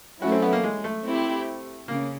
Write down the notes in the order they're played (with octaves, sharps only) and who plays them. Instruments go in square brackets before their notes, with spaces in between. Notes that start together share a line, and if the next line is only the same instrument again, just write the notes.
[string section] F#3 A3 C#4 E4 [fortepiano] F#4
[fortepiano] C4
B3
A#3
G#3
A3
[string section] C4 E4 G4
[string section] C#3 [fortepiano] A#3